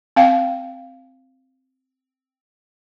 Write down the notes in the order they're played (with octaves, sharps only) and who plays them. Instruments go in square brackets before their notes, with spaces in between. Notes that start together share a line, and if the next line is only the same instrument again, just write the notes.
[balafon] C4 F5 G5